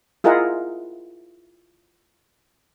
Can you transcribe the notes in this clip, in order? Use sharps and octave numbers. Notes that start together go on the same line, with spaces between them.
E4 F4 G#4 A#4 D#5 F#5